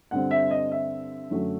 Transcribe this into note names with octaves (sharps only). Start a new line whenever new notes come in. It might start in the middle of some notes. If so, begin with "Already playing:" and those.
G2 D3 G3 C4 F#5
E5
D#5
E5
F#2 D3 F#3 A3